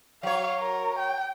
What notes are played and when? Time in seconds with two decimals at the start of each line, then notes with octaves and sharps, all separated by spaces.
0.23 F#3 C#5 F5
0.60 A#4
0.99 G5